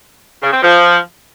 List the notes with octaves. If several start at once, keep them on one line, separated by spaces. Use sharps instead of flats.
C#3
C4
F3